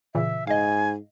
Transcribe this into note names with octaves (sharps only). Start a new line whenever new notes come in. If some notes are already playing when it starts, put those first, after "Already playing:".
A#2 C#3 E3 E5
G#2 D#5 F5 G#5